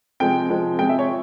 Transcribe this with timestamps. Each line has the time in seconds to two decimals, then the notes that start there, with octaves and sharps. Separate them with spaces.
0.20 C3 F3 G#3 G5
0.50 C3 F3 G#3
0.79 C3 F3 G#3 G5
0.89 E5
0.99 C#5